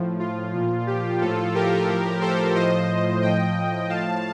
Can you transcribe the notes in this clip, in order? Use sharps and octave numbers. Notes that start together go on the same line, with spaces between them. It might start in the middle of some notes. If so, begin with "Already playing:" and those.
Already playing: A2 F3
F4
A#2 F3
G4
A2 F3 F4 A4
G4 A#4
A2 F3
A4 C5
A2 F3 C5 D#5
A2 F3 D#5 G5
A2 F3 F5 A5